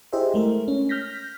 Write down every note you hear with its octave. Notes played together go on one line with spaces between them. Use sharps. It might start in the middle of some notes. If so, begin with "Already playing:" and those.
E4 G4 G#4 C5 D#5 E5
G#3 A3 A#4
C#4
F6 G6 A#6 B6